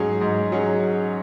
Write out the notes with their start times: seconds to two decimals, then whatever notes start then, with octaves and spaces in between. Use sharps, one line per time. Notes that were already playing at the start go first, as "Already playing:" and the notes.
Already playing: G#2 F#3 C#4 G#4
0.21 G#2
0.52 F#3 C#4 G#4